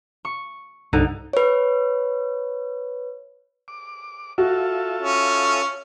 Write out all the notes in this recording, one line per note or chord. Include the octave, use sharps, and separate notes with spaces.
C#6
C2 G2 D3 D#4
B4 C#5
D6
F4 F#4 A4 E5
C#4